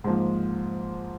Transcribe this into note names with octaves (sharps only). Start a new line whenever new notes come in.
G#2 F3 A#3